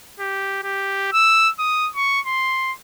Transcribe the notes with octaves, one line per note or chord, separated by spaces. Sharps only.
G4
G4
E6
D#6
C#6
C6